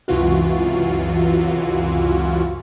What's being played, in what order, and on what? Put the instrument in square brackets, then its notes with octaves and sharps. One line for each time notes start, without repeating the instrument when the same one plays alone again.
[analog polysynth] C#2 F#2 C3 E3 F4 F#4